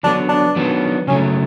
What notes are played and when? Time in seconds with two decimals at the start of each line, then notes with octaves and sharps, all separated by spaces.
0.03 D3 F#3 B3 D4
0.29 D4
0.55 D#3 F#3 B3 D4
1.07 C#3 F#3 A3 C#4